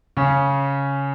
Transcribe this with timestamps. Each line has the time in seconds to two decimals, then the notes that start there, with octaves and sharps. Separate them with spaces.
0.17 C#3 C#4